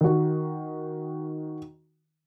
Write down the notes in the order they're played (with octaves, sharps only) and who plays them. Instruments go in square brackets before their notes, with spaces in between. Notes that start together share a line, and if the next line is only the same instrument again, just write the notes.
[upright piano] D#3 F#4